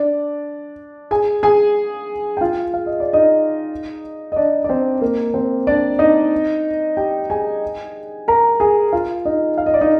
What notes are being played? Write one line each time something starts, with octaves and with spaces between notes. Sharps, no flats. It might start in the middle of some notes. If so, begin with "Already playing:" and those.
Already playing: D4 D5
G#4 G#5
G#4 G#5
G5
F4 F5
F5
D#5
D5
D#4 D#5
D#5
D4 D5
D5
C4 C5
A#3 A#4
C4 C5
D4 D5
D#4 D#5
G4 G5
G#4 G#5
A#4 A#5
G#4 G#5
F4 F5
D#4 D#5
F5
D#5
D5
D#4 D#5